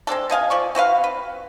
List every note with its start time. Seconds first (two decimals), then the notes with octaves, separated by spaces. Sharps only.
0.07 G#3 C4 D4 A4
0.30 B2 D#5 F5 G#5
0.50 F3 D5 C#6
0.75 C4 F#4 B4 F5
1.04 B4